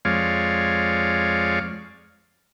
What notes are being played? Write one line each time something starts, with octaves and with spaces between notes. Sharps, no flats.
F2 G#3 C#5 D5 F5